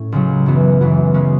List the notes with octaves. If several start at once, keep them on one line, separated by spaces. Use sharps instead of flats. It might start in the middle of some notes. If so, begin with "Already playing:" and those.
Already playing: A2 C#4
C#2 C#3 F#3
F#2 E3 B3 F#4
F#2 E3 B3 F#4
C#3 G#3 C#4 F#4